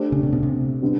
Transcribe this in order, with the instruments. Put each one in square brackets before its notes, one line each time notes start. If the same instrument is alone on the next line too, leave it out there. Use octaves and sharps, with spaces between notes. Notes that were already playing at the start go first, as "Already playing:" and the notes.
Already playing: [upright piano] A3 D4 G4 C5
[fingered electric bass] C#3
C3
B2
C3
[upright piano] D3 G3 B3